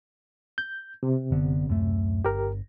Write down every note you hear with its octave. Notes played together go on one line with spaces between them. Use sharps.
G6
C3
F#1 D3 B3
D1 F#2 A3
G1 G4 A#4